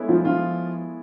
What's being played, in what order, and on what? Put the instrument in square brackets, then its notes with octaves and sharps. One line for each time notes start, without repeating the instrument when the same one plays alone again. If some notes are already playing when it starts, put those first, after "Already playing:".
Already playing: [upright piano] G#3 B3 E4 A4 C#5
[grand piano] F3 F4
F3 F4